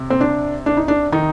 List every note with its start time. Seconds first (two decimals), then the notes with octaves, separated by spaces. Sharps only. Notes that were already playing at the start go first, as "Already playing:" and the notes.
Already playing: C3
0.10 C4
0.21 D4
0.66 D4
0.77 D#4
0.88 D4
1.12 D#3 D#4